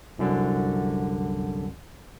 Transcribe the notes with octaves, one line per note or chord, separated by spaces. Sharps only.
C2 F#2 D3